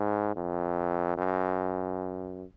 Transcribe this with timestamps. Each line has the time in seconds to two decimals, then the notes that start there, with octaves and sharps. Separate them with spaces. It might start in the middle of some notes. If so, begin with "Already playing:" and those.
Already playing: G#2
0.36 F2
1.17 F#2